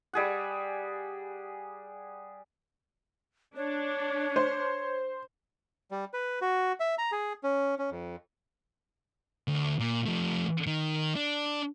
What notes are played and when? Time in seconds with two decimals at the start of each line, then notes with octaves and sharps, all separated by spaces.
0.13 G3 G#4 F#5
3.56 D4 C#5
4.36 C5
5.91 G3
6.14 B4
6.42 F#4
6.80 E5
6.98 A#5
7.12 G#4
7.43 C#4
7.79 C#4
7.91 F2
9.48 D2
9.80 A#2
10.06 F3 A3
10.67 D#3
11.16 D4